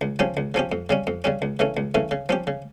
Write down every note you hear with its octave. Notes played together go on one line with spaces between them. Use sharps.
C#2
C#3 F3 C#4 G4
C#2
C#3 F3 C#4 G4
F2
C#3 G3 C#4
F2
C#3 G3 C#4
C#2
C#3 E3 A3 C#4
C#2
C#3 E3 A3 C#4
C#3
F3 C#4 G4
C#3